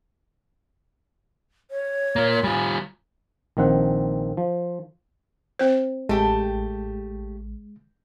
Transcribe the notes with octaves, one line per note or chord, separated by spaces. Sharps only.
C#5
A#3 F4
G3 F4 G#5
A#1 D#3 C4 F#5
F3
C4 C5
A1 G#3 A3 G4